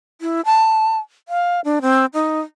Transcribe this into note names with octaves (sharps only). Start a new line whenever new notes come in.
E4
A5
F5
D4
C4
D#4